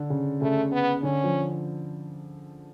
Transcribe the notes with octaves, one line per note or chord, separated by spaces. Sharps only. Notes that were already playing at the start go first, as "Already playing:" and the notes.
Already playing: D3
C#3
C#3 A3
B3
D3 C#4
F3